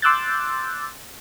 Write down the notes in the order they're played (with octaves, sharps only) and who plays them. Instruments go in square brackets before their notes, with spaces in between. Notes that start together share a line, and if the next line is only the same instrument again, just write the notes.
[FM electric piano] C6 D6 E6 F#6 G6 A6